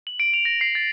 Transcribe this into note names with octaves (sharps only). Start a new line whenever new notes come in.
F#7
D7
F7
A#6
C7
A6